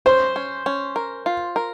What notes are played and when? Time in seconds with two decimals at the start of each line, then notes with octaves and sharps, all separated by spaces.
0.06 C#4 C5
0.36 C#4
0.66 C#4
0.96 A#4
1.26 F4
1.56 A#4